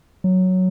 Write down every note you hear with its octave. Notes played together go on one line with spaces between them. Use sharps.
F#3